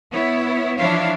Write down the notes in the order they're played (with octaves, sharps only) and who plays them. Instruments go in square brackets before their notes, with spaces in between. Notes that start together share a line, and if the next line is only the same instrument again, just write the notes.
[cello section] B3 E4 C#5
E3 F3 D4 E4 C#5 F5